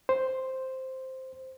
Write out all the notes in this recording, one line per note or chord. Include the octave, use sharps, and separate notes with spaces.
C5